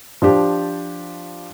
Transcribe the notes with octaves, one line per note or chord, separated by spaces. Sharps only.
F3 D4 G4